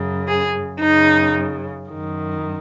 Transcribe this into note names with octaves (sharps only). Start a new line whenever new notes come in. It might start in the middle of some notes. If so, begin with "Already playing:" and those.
Already playing: F#2 C#3
G#4
F#2 C#3 D#4
F#2 D#3